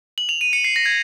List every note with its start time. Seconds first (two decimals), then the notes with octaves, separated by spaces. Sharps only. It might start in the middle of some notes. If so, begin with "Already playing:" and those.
0.18 F#7
0.29 F7
0.41 D#7
0.53 C#7
0.64 C7
0.76 A#6
0.86 G#6